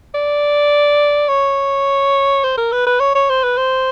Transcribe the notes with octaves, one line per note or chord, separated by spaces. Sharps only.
D5
C#5
C5
A#4
B4
B4
C#5
C#5
C5
B4
C5